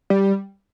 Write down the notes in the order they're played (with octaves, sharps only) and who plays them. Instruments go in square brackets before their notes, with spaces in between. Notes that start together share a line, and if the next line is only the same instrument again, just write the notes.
[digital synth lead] G3